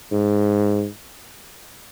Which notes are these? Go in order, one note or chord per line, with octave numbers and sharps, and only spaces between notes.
G#2